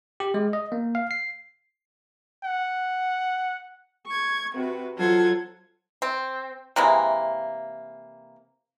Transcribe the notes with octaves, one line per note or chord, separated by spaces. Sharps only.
G4
G#3
D#5
A#3
F5
C7
F#5
C#6 G#6
C3 F#4 B4
F#3 F4 A4 C5 F#5 G#6
C4
C3 E3 G#3 A#3